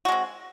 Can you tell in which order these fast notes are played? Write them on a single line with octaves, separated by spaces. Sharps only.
F#4 G#3 C4